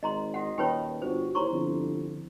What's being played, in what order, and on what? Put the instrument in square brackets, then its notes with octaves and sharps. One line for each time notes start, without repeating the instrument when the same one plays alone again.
[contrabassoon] G#1 [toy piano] D#5 A#5 C6
[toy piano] F#4 F#5 [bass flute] D#5
[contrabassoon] D#1 [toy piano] G4 B4 C#5 [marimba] G5 A5 B5
[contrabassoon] G1 [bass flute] F#4 [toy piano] C5
[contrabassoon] D#2 [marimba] E4 C5 [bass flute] C#5 [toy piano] A#5 C6 C#6
[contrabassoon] G1 [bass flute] D3 [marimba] F3 C4